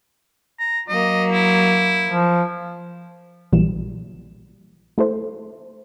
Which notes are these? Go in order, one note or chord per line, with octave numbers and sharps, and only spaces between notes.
A#5
F#3 A#3 D#5
E4
F3
A#1 A#2 E3 F#3 G3 E7
A3 E4 A4 C5